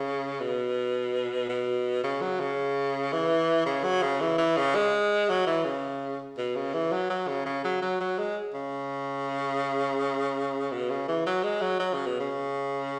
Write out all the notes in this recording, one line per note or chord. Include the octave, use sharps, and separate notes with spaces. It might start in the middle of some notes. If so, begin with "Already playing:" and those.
Already playing: C#3
B2
B2
C#3
F#3
C#3
E3
C#3
F#3
C#3
E3
E3
C#3
G#3
F#3
E3
C#3
B2
C#3
E3
F#3
F#3
C#3
C#3
F#3
F#3
F#3
G#3
C#3
B2
C#3
E3
F#3
G#3
F#3
F#3
C#3
B2
C#3